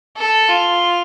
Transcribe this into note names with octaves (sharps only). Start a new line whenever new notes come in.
A4
F4